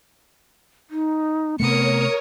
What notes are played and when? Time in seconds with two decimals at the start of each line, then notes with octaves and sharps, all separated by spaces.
0.90 D#4
1.60 C3 A3 B3 A#4 C#5 D#6 C#7